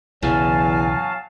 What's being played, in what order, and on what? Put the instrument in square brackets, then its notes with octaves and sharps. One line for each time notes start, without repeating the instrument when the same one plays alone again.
[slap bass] B1 C#3 E3 [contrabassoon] E2 [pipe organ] F#3 F5 A5 [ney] G#5